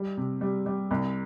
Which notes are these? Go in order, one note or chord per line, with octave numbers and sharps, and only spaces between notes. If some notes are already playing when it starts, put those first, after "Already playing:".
Already playing: G3
C3
G3
G3
C2